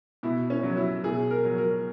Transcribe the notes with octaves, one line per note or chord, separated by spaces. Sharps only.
B2 E4
C#4
F#3
E4
B2 G#4
A#4
F#3
A#4